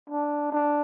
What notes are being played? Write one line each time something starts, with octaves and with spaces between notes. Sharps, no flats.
D4
D4